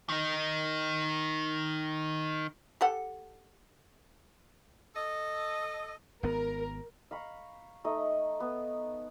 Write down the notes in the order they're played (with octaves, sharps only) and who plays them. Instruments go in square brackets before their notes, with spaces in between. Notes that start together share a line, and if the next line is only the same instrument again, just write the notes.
[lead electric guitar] D#3 D#4
[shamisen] G4 A4 F#5
[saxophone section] A4 D#5
[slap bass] G#1 B3 [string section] A#4
[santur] F5 A#5 B5 C#6
A3 D#4 D#5
B3